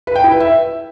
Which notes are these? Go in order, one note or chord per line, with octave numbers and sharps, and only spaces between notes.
B4
G5
E4
B4
E5